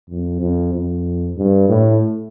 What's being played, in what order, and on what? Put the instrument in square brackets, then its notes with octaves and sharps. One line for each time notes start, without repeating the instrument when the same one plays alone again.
[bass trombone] F2
F2
F2
G2
A2